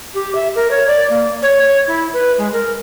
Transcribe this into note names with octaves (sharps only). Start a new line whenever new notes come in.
G4
E5
A#4
C#5
D5
A#3
C#5
C#5
E4
B4
G#3
A#4